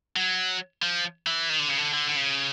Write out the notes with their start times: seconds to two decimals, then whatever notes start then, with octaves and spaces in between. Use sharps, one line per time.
0.16 F#3
0.82 F3
1.27 E3
1.49 D#3
1.59 D3
1.68 C#3
1.78 D3
1.94 D3
2.09 D3
2.16 C#3